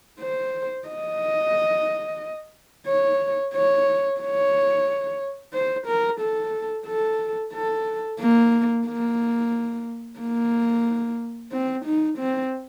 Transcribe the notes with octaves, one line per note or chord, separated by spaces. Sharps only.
C5
D#5
C#5
C#5
C#5
C5
A#4
A4
A4
A4
A#3
A#3
A#3
C4
D#4
C4